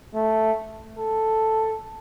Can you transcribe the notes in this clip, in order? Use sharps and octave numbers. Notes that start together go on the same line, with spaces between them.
A3
A4